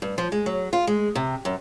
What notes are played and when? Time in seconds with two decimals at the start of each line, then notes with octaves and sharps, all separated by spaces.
0.02 G2
0.18 F3
0.32 G#3
0.46 F#3
0.73 F4
0.87 G#3
1.15 C3
1.45 F#2